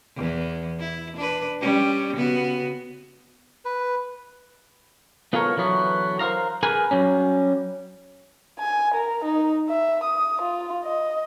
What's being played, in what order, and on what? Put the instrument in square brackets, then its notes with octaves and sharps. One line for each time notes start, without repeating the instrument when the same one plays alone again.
[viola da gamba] E2 E3
E4
D4 B4
G3 C#4
C#3 B3 F#4
[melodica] B4
[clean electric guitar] B3 F4 A4 A#4 C#5
D3 E3 F#3 B3 F#4
A#4 C5 E5 F5 A#5
G#4 A#4 B4 G#5
F#3 G3 C#4
[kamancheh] G#5
A#4
D#4
E5
D#6
F4
D#5